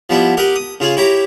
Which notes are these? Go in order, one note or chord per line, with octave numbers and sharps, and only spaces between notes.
F3 G3 B3 E4
G4 A#4 D#5 F#5
D#6
C#3 F4 G#4
E4 G4 C#5 A#5